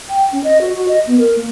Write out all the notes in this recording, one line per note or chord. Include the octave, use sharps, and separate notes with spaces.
G5
C#4
D#5
F#4
F#4
D#5
B3
A#4
A#3